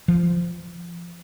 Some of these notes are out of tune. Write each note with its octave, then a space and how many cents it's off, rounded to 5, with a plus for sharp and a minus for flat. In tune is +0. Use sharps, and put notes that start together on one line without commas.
F3 -15